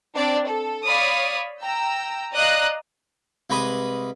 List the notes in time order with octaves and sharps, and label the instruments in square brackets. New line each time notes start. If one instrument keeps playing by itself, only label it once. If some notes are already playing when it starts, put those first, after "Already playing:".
[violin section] C4 D4 D5
A4
C#5 D5 F5 B5 D#6
G5 A#5 E6
D5 D#5 F5 A#5 D#6 F#6
[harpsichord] C2 G#3 B4 B5 D6 D#6